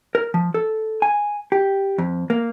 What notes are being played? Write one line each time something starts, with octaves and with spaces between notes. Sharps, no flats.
A#4
F3
A4
G#5
G4
F2
A#3